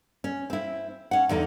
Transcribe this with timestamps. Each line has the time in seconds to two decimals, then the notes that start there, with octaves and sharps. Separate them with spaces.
0.24 C#4
0.50 C4 E4
1.11 C#4 F#5
1.29 E2 D3 D#4